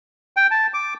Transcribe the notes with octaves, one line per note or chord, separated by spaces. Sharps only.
G5
A5
D6